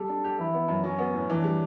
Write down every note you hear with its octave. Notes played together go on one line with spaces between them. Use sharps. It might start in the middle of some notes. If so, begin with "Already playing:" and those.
Already playing: G3 A4
D4
G4
E3 E4
B3
F#2
F#3 C#4
B3
A2
E3 D4
G3